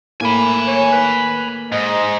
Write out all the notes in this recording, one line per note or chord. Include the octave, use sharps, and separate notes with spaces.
A2 A#3 G#5 B5 D#7
C#5
B4
G#2 D#5